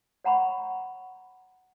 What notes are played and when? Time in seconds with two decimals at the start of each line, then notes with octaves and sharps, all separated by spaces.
0.24 C#5 F#5 A#5 B5 C#6